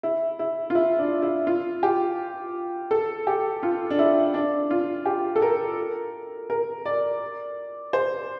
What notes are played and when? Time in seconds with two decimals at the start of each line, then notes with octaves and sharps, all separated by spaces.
0.03 E4
0.39 E4
0.70 F4
0.75 E4
0.99 D4
1.22 E4
1.47 F4
1.83 G4
2.91 A4
3.27 G4
3.63 F4
3.90 D4
3.99 E4
4.34 D4
4.71 F4
5.06 G4
5.36 A4
5.42 A#4
6.50 A#4
6.86 D5
7.93 C5